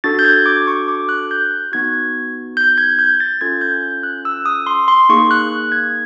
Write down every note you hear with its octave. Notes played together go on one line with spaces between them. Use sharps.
D4 F#4 A4 A6
G6
G#6
D6
C#6
D6
F#6
G6
F#6
B3 D#4 F#4 G#6
G6
G#6
G6
A6
C#4 F4 A4 G#6
G6
G6
F#6
E6
D#6
C6
C6
A#3 D#4 G#4 C#6
F#6
G#6